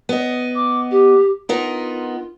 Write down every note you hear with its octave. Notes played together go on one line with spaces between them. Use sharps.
B3 D#5
D6
G4
B3 D#4 F4 A#4